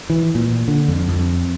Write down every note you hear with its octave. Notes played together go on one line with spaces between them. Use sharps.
E3
A#2
D3
F2
F2